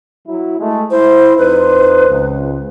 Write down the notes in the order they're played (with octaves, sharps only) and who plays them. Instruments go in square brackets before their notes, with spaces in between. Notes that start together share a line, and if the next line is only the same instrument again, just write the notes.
[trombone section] F#3 E4
G#3 A3
[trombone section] E4 [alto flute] C5
[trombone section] F2 D#4 C5 [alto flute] B4
[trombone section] C#2